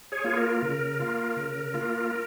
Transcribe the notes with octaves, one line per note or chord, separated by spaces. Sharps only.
G#4 C#5
A#3 F4 G#4
A#4
C#3 A#4
A#3 F4
C#3
A#3 F4
A#4